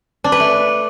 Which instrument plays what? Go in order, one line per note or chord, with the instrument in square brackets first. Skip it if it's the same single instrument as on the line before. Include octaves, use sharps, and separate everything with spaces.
[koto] D4
B4
A3